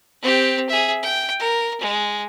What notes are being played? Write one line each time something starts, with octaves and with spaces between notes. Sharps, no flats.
C4 G4
G#4 E5
G5
A#4
G#3